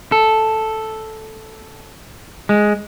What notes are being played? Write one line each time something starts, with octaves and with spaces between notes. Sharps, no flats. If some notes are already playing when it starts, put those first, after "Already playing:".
A4
G#3